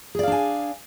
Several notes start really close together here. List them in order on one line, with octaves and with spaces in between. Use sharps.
G#4 D5 F5 D4 G#5